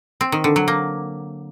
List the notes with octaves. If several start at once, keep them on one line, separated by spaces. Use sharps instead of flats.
C4
D#3
D3
F#3
A#3